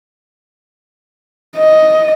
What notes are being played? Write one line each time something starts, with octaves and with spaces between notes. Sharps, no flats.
D#5